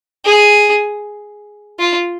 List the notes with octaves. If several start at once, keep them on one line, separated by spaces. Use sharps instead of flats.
G#4
F4